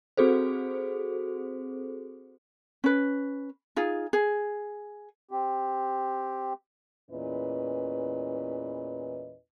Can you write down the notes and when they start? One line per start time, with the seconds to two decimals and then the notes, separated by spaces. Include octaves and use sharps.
0.17 C4 F#4 G#4 A4 C5
2.84 C#4 B4
3.76 D#4 F4 G#4
4.13 G#4
5.31 C4 G4
7.10 E2 A#2 E3 C#4 B4 D#5